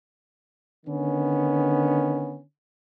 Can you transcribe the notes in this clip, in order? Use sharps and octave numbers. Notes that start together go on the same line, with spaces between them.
D3 D#3 B3 C#4